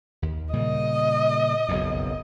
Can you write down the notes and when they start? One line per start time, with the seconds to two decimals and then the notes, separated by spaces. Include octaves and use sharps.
0.22 D#2
0.53 A#2 C#3 G3 D#5
1.69 F#1 B1 F2